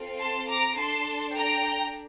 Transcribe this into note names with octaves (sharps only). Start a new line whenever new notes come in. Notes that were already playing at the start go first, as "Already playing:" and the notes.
Already playing: C4 F4 A4
A5 C6
A#5 D6
D4 A4 A5 C6
G5 A#5